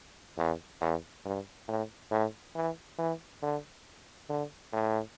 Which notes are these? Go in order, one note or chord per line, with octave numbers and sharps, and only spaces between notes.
E2
E2
G2
A2
A2
E3
E3
D3
D3
A2